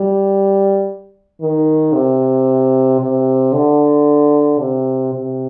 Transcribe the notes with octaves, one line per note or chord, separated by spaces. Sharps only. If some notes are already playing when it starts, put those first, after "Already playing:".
Already playing: G3
D#3
C3
C3
D3
C3
C3